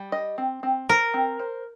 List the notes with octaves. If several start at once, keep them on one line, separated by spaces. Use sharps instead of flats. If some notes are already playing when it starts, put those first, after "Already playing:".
Already playing: G3
D#5
C4
C4
A#4 C5
C4
C5